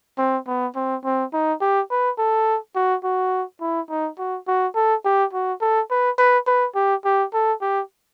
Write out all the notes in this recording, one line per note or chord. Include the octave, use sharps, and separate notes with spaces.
C4
B3
C4
C4
D#4
G4
B4
A4
F#4
F#4
E4
D#4
F#4
F#4
A4
G4
F#4
A4
B4
B4
B4
G4
G4
A4
G4